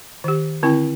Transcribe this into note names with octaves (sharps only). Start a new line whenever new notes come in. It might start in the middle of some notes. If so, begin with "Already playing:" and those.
D#3 G4
D3 C4 E4 G5